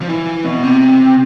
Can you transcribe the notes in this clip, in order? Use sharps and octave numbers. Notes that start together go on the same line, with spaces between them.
F3
E3
B2
C3